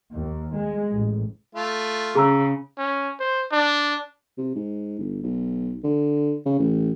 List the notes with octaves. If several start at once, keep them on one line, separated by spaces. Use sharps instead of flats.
D#2
G#3
A1
A3 F4
C#3 G#4 A#5 E6
C#4
C5
D4
C3
G#2
G1
B1
D3
C#3
A1